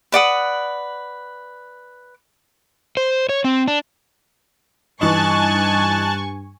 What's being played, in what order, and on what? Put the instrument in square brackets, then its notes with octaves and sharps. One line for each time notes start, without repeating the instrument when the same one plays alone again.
[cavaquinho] B4 D5 F#5 D#6
[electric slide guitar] C5
C#5
C4
D4
[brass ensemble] G2 [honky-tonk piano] E3 D#4 [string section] G#5 C#6 [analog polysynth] A5 F#6 A6